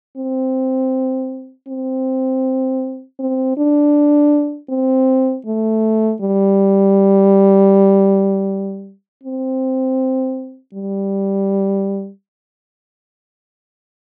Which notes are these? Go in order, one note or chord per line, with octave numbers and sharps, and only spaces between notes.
C4
C4
C4
D4
C4
A3
G3
C4
G3